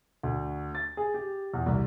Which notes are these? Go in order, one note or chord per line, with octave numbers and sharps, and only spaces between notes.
D2
A6
G#4
G4
E2
C2